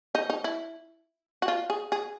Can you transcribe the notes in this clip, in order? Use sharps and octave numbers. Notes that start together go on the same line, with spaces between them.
D#4
D#4
E4
F#4
F4
G#4
G#4